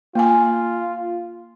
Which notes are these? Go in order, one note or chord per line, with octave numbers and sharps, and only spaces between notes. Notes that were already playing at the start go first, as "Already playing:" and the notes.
A#3 F4 G#5